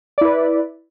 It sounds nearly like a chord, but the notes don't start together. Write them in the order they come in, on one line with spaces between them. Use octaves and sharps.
D5 E4 B4